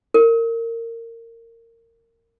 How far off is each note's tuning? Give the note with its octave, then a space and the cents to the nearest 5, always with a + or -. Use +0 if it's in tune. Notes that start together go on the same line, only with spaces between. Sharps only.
A#4 -25